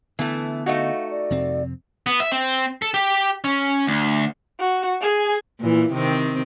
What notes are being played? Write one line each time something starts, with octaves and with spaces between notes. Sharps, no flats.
D3 E3 A3 B3
A3 D#4 F#4 F5
D5
F2 C3 C4
B3
E5
C4
A4
G4
C#4
D2
F#4
G#4 G#5
A#2 E3
C3 D#3 C4